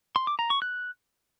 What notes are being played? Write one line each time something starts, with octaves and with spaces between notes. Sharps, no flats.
C6
D6
A#5
C#6
F#6